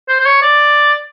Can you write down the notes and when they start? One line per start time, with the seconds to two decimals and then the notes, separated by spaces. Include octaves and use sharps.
0.09 C5
0.20 C5
0.25 C#5
0.42 D5